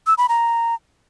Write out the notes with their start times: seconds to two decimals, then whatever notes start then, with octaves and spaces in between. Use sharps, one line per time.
0.07 E6
0.18 B5
0.29 A#5